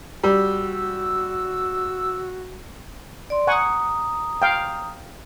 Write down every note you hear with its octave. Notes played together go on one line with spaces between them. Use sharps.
G3 F#4 E6
D5 C6
F#5 G#5 A#5 C#6 D#6
F5 G5